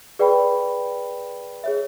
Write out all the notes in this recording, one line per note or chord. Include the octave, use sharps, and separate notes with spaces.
G#4 B4 D5 G5 B5
G#4 C#5 E5